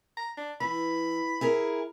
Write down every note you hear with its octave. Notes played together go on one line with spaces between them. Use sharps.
A#5
D4
E3 B5
E4 G#4 A#4